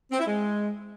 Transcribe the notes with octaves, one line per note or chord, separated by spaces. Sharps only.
C4
E4
G#3